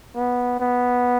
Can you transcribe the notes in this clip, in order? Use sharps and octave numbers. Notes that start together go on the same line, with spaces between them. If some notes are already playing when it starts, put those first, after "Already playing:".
B3
B3